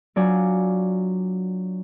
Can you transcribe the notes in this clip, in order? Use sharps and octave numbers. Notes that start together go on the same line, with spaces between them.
F#3 D4 F4 D5 G#5